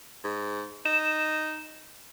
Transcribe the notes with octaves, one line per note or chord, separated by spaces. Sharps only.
G#2
D#4 E7